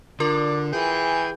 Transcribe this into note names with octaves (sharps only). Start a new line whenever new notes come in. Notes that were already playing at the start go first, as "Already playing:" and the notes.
D3 F4 A#4 D5 C6
E3 G#4 G5